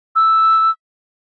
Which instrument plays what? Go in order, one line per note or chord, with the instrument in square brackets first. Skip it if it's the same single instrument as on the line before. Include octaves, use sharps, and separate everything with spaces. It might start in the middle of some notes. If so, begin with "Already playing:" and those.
[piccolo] E6